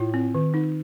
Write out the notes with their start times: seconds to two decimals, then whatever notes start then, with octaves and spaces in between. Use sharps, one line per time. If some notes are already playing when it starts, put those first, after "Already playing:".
Already playing: A2 F4
0.14 C4
0.35 D#3
0.54 D#4